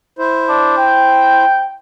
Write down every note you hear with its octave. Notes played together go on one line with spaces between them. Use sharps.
E4 C5
D4
G5